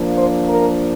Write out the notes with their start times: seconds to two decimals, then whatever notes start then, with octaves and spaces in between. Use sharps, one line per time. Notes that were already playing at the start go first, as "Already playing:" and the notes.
Already playing: F3 A#3 D4
0.17 C5
0.49 A#4